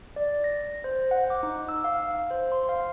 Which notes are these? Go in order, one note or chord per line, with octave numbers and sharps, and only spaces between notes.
D5
A#6
C5
F#5
D6
D#4
E6
F5
C5
C6
F5